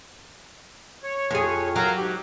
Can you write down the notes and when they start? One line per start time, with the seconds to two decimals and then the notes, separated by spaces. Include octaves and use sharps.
1.03 C#5
1.31 F2 G#4
1.76 F#3 A#4 F5 A#5
1.97 G#2 G4